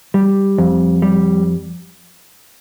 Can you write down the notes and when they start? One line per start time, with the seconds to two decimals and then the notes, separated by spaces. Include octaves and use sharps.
0.14 G3
0.58 F2
1.02 G3